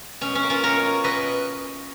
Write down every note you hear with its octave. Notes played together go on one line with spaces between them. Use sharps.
B2 C#4
C#4
A#3
C#4 F4
B2 A#4 C#5
A#3
B2 B4 D#5